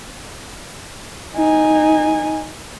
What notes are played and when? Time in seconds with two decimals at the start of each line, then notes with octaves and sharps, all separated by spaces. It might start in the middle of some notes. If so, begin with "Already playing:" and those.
1.35 D#4 G#5